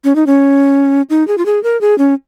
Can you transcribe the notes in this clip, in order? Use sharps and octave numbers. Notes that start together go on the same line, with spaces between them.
C#4
D#4
C#4
D#4
G#4
F4
G#4
A#4
G#4
C#4